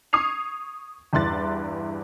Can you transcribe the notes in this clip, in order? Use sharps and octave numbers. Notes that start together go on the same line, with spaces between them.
C#6 D#6 G#6 C7 F7
E2 G2 E4 C6 F#6 A6